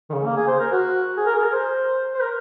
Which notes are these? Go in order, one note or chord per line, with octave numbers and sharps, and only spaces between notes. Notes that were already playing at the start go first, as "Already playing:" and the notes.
D#3
C#3
A#3
G#4
C5
A#4
F#4
G#4
A#4
G#4
A#4
C5
C5
A#4